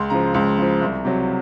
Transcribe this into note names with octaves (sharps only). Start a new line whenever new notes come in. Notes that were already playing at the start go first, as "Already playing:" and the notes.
Already playing: C#2 C6
C#3 F3 A#5
C#2
C#3 F3
C2
C3 F#3